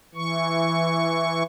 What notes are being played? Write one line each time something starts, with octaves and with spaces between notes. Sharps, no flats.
E3 C#6